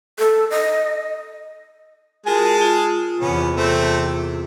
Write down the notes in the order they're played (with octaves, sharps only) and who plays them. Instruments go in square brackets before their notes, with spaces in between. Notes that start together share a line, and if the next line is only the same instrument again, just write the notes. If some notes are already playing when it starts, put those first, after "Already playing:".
[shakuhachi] A4
D#5
[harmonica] G#3 G#4 A5 [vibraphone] F4 F#4 A#4
[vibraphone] F4
[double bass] E2 C3 [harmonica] B3 C#4
[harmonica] A3 C4